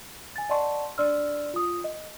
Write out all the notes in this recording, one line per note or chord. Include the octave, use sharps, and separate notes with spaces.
G#5 A6
D5 D#5 F#5 A5 C6 C#6
D4 D5 C6 E6 F6
F4 D#6
D#5